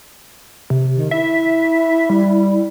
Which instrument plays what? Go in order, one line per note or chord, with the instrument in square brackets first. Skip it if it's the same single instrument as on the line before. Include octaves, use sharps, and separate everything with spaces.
[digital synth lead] C3
[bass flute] D#3
[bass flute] E4 [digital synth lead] E5
[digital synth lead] G3